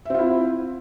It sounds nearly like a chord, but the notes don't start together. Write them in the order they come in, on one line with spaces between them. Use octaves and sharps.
E5 C4 F4 E4